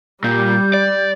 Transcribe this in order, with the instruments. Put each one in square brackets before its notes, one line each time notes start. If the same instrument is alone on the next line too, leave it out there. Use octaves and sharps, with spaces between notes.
[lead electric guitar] A#2 [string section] G3 [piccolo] G6
[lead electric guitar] D5